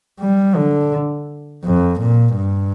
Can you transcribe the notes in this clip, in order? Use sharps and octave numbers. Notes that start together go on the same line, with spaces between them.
G3
D3
F2
A#2
G2